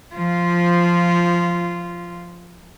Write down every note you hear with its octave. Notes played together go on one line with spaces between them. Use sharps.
F3 F4